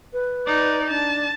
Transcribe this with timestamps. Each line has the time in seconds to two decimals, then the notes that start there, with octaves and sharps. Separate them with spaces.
0.13 B4
0.46 D#4 D5
0.89 D4 A5